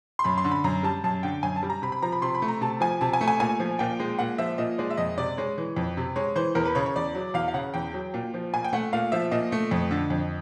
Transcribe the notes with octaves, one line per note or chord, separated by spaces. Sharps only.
C6
F#2 B5
C6
D3
B5
F#2 A#5
G3 A5
F#2 A5
D3 G5
F#2 G#5
A5
G3
A#5
C3 B5
B5
F3 A#5
B5
C3 C6
B5
A3
A#5
C3 A5
F3 G#5
C3 A5
G#5
A3
G#5
A#2 G#5
F3
A#2 G5
G#3
A#2 F#5
F3 E5
A#2 D#5
G#3 D5
E5
F2 D#5
C3 D5
G#3 C#5
E3
F2
C3
G#3 C#5
E3 C5
E2 A#4
B4
C#3 C#5
C#5
E2 D5
F#3
E2 F5
F5
C#3 F#5
E2 G5
F#3
A#2
F3
A#2 G#5
G5
A3 F#5
A#2 F5
F3 E5
A#2 D#5
A3
F2
D3
F2